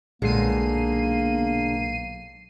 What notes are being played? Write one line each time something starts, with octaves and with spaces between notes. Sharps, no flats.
B1 A#2 D3 G#3 A#3 C7 D#7